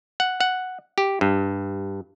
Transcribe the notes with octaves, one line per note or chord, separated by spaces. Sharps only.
F#5
F#5
G4
G2